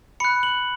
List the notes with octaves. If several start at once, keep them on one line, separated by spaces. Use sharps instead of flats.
B5 F#6 C#7
F#7